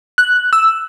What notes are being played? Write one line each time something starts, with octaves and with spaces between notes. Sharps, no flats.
F#6
E6